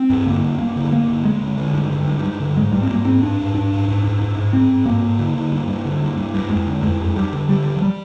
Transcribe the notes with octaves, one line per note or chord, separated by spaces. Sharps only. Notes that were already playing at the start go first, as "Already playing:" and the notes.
Already playing: C4
G2
D3 A#3
G2
G2 A#3
D3
G2 A#3
D3
G2 G#3
D3
D3
G2
D3
G2
G2
D3
G#2 G#3
G#2 G3
C4
G#2 A#3
G#2 C4
G#2 D4
G#2
G#2 D4
G#2
G#2
G#2
G#2
G#2
G#2 C4
G#2
G#2 A#3
G#2
D3
D3
G2
G2
D3
G2
G2
G2
F2 G#3
D3
F2 G#3
F2
F2 G3
D3
D3 G3
D3
F3
G3